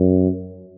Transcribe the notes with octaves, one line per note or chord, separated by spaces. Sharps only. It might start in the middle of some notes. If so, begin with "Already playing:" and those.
Already playing: F#2